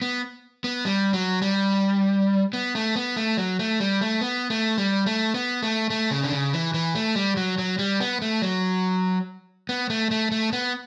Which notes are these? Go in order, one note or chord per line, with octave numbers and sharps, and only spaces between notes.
B3
B3
G3
F#3
G3
B3
A3
B3
A3
F#3
A3
G3
A3
B3
A3
G3
A3
B3
A3
A3
C#3
D3
C#3
E3
E3
A3
G3
F#3
F#3
G3
B3
A3
F#3
B3
A3
A3
A3
B3